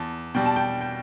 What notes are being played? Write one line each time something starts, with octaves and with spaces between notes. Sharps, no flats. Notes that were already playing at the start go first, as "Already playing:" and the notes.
Already playing: E2 A5
B2 G3 G5
A5
G5
G5